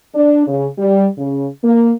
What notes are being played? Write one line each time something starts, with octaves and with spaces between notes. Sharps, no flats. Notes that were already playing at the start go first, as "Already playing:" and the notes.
D4
C#3
G3
C#3
A#3